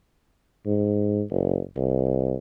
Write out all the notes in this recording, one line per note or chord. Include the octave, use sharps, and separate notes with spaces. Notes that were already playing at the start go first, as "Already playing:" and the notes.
G#2
F#1
C2